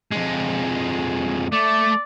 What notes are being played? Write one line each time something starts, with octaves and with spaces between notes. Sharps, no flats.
F2 G#3
A3 D5